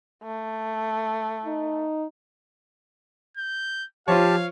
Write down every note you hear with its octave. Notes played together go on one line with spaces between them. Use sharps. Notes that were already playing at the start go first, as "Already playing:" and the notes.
A3
D#4
G6
F3 F4 G4 C5 C#5 F5 A5